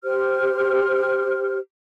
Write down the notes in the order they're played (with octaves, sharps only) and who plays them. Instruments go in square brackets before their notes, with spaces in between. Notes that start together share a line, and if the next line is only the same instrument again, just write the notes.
[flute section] G4 C5 F6